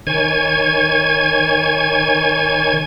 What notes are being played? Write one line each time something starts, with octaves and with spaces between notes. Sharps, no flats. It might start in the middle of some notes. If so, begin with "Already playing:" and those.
D#3 C#5 G#5 G#6